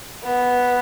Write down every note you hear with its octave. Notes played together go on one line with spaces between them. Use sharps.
B3